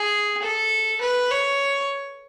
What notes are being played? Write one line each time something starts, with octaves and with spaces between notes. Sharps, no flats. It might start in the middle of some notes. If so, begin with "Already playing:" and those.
Already playing: G#4
A4
B4
C#5